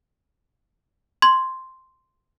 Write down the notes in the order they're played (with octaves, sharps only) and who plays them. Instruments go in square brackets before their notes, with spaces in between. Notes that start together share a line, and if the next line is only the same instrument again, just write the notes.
[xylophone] C6 G#6